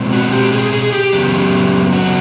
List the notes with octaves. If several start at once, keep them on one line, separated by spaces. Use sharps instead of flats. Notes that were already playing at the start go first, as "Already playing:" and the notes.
Already playing: B2 G#3 C4
F#4
G4
G#4
G#4
G4
F#2 C#3 F#3 B3
F#4